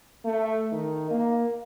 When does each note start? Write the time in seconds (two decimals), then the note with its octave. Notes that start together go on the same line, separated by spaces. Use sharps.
0.25 A3
0.72 D#3
1.11 A#3